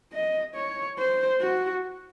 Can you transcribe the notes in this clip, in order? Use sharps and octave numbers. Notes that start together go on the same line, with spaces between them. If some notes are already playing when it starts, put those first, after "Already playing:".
D#5
C#5
C5
F#4